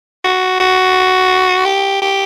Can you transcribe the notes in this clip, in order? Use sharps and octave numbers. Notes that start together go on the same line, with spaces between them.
F#4
F#4
G4
G4